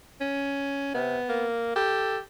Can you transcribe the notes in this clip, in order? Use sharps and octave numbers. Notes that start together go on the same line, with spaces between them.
C#4
C3 B3
A#3
G4 A4